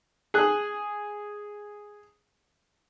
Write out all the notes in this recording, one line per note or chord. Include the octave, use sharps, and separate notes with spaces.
G#4 F#6